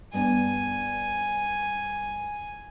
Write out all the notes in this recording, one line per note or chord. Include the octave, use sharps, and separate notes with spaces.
G2 B3 D4 G#5